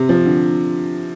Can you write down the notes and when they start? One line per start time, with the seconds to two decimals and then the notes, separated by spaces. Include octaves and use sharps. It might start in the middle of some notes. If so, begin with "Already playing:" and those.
Already playing: C3
0.09 F3
0.26 D3